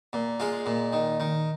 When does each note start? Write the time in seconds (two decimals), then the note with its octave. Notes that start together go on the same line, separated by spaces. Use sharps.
0.13 A#2
0.40 G#3 F4
0.66 A#2
0.93 D#3
1.20 D#3